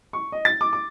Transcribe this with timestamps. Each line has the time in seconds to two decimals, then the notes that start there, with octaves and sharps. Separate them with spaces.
0.13 C#6
0.32 D#5
0.45 A6
0.61 D6
0.73 D6